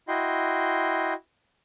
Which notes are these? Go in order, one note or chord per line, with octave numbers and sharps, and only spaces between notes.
E4 F#4 D#5 G5 C6